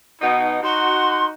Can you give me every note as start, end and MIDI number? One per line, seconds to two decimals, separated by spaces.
0.22 0.59 47
0.22 0.59 63
0.22 0.60 78
0.63 1.34 63
0.63 1.34 66
0.63 1.26 84